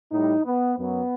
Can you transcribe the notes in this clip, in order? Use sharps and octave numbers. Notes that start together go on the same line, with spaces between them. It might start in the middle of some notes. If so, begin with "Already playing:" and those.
A2 G3 D#4
B3
F#2 F#3 B3